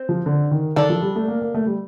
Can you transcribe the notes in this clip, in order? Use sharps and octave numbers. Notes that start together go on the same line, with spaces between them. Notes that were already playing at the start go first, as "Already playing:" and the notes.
Already playing: C4
F3
D3
D#3
D#3 D4 A4 D5
F3
G3
A3
A#3
A#3
A3
G3